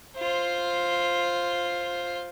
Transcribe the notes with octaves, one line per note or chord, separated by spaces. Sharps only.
F4 C5